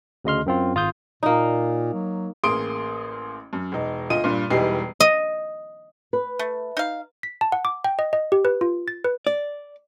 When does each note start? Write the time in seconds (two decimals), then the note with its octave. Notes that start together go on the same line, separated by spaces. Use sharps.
0.25 D2 C#3 D#5 C6 F6
0.46 F#2 C4 F4
0.75 G#1 F4 D#6 G6
1.23 A#2 A#3 D#4
1.94 F#3
2.43 A1 A#3 G#4 C6 D#6 D7
3.53 F#2
3.72 E1 D#4
4.10 D2 F4 D#5 D#7
4.24 G2 A#2
4.50 E1 E3 G3 D#4 G4 C7
5.00 D#5
6.13 B4
6.39 A3
6.77 D#4 F5
7.23 B6
7.41 A5
7.52 F#5
7.65 D6
7.84 G5
7.99 D#5
8.13 D#5
8.32 G4
8.45 B4
8.61 F4
8.88 A6
9.04 B4
9.27 D5